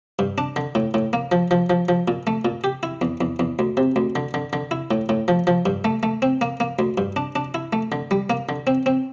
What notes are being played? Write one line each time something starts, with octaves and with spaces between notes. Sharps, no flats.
G2
D4
D3
A2
A2
A#3
F3
F3
F3
F3
A#2
A3
A#2
G4
E4
E2
E2
E2
D2
C3
D2
D3
D3
D3
E4
A2
A2
F3
F3
G2
A3
A3
C4
A#3
A#3
D2
G2
D4
D4
E4
A3
D3
G3
A#3
D3
C4
C4